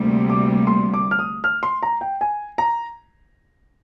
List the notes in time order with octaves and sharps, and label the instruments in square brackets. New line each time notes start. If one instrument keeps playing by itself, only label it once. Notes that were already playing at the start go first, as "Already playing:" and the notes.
Already playing: [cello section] D2 C3 G3 A#3
[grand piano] D6
C6
D6
F6
D#6
F6
C6
A#5
G5
G#5
A#5